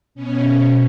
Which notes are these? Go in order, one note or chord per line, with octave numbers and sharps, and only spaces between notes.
B2 C#4